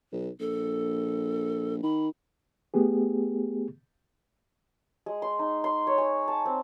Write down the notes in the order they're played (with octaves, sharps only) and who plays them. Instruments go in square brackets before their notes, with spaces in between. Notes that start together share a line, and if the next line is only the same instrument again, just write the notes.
[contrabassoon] B1
[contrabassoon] A#1 [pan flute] A4
[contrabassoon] D#3 [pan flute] B5
[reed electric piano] A3 B3 G4 G#4
[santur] G#3
C6
D#4
C6
C#5
G#5
A5
C4